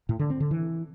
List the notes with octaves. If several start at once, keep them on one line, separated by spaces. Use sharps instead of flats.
A2
D3
C4
D3
E3